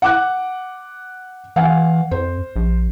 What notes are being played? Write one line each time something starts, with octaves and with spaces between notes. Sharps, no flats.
F#5 D6 F#6
E3 F5 F#5 G#5
F2 C5
A#1